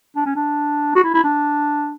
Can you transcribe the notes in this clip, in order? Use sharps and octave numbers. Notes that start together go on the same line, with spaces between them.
D4
C#4
D4
F#4
E4
E4
D4